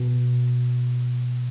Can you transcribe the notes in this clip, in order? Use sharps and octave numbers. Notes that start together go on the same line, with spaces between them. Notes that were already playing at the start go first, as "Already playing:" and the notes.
Already playing: B2